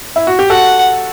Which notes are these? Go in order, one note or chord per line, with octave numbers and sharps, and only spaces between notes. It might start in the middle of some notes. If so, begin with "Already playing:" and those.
E4
F#4
G4
F#4 A4 F#5